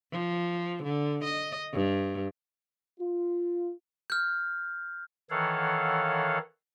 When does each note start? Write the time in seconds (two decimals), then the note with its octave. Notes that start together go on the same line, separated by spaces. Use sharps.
0.12 F3
0.84 D3
1.24 D#5
1.73 G2
3.00 F4
4.10 F6 G6
5.30 D#3 E3 A4 C#5 F5 F#5